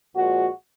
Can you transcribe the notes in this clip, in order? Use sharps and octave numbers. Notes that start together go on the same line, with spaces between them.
A#1 A#2 F3 G#3 F#4